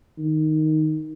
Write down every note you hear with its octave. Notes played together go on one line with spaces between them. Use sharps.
D#3